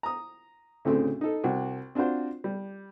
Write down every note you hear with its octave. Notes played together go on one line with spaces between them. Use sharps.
A#5 D#6
D2 A2 C#3 A3 C4
D#4 A4
C2 F#4
C4 D4 F4 F#4 C5
G3